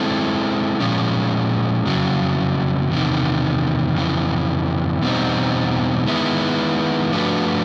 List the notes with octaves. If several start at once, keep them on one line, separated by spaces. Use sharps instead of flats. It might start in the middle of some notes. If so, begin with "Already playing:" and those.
Already playing: G#3 C4 E4 A4
A#2 F3 G#3 C#4
F2 C#3 F#3
E2 C3 D#3
F2 C#3 E3
E2 B2 G3 C4 D#4
D#3 G#3 B3 E4
F3 A3 D4 F#4 B4